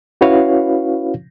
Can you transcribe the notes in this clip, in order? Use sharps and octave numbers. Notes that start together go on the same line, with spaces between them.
C#4 E4 F#4 B4 C#5 F5